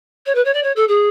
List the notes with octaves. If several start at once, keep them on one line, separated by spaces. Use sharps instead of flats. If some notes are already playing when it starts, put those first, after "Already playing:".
C#5
B4
C#5
D5
C#5
A4
G#4